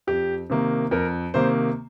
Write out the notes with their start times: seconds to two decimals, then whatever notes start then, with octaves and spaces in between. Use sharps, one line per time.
0.07 F2 G4
0.50 C3 D#3 A#3
0.91 F2 A#4
1.34 C3 D#3 A#3 C5